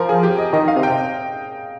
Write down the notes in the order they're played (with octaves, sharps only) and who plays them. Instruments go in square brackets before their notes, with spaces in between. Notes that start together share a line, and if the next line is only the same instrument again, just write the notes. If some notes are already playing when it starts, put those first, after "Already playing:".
Already playing: [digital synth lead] F3 [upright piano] A#4
[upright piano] G#4
G4
D#5
[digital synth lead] D#3 [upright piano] D#5
[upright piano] F5
[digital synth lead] C3
[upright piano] G5